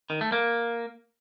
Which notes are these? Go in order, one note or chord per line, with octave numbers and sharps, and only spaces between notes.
D#3
A3
A#3